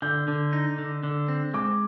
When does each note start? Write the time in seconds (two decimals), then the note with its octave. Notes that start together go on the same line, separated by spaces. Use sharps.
0.02 D3 G6
0.28 D3
0.53 D#4
0.78 D3
1.03 D3
1.28 C4
1.54 G#3 D6